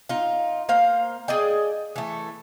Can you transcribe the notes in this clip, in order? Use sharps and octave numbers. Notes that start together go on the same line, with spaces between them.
D#4 F4
A#3 C5 F5
G#4 D5 D#5 G5
E3 A3